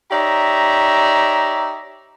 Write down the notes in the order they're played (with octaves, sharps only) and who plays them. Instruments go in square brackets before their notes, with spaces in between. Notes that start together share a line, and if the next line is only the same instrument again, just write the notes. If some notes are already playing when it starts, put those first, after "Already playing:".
[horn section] D#4 G4 C#5 D5 E5 A#5